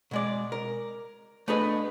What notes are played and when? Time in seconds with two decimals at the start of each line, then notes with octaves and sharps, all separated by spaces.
0.11 B2 G#3 D5
0.52 A#4
1.48 A3 B3 D4 G#4 B4 D#5